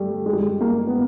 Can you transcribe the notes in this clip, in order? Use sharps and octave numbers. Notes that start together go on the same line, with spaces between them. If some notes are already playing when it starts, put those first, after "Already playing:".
Already playing: G3 A3
G#3
G3
G#3
A#3
B3